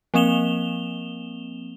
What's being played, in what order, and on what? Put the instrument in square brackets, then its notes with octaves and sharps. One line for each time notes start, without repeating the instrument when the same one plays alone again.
[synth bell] F3 A#3 C4 E7 F7 G7